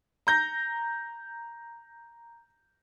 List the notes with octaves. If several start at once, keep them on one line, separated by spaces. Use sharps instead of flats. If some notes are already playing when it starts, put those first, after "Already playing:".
A#5 G6 A#6